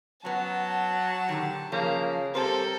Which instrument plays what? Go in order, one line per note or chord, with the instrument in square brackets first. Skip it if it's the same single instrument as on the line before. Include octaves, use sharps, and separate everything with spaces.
[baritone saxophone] F#3 [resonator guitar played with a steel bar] B3 C#4 [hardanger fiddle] A5
[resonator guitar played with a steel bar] A#2 D3 D#3 [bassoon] G4
[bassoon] C#3 [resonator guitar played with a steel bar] F3 [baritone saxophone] A#3
[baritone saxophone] C3 [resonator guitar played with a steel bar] G3 C5 [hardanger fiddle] A4 [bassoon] A#4